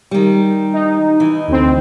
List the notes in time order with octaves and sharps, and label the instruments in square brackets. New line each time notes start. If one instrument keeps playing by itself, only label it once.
[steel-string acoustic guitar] D#3 G3
[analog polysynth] D#4
[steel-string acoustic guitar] E3
[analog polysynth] D2 C4